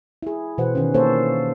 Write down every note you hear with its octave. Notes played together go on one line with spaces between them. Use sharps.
E4 G#4
B2 E3 B4 C5 F#5
D#3 C#4
A#3 D4 G4 A4 C5 C#5